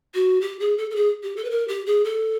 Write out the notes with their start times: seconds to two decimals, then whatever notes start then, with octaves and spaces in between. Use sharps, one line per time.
0.14 F#4
0.41 G4
0.60 G#4
0.78 A4
0.91 A4
0.96 G#4
1.23 G4
1.37 A4
1.44 B4
1.50 A#4
1.68 G4
1.86 G#4
2.05 A4